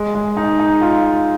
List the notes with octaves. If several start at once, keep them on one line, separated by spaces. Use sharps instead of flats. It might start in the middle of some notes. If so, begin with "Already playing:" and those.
Already playing: G#3
G#3
D#4
D#4
F4